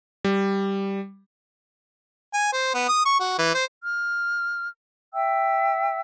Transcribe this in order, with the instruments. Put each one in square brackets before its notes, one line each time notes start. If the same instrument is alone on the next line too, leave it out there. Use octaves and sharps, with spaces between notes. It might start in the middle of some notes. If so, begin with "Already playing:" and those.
[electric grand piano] G3
[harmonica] G#5
C5
B3
D#6
C#6
F#4
E3
C5
[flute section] F6
E5 G5 E6